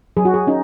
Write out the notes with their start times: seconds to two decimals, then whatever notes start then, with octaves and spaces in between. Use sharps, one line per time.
0.17 F#3 G#4
0.25 F#4
0.34 G#4
0.47 C#4 D#4